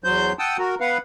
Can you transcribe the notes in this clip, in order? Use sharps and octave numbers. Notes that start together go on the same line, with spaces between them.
E2 F#3 C5 G6
F#5 G5 A5 D#6 E6
F#4 A#4
B3 B4 F5 F#5